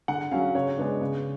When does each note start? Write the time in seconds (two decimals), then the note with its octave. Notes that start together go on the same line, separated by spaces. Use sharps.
0.08 D3 F#5
0.32 F#3 C#4 F5
0.55 C#3 C#5
0.78 G#3 B3 D4
1.01 C#3